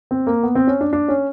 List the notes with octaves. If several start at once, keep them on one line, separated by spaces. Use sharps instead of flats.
C4
A#3
B3
C4
C#4
D4
D4
C#4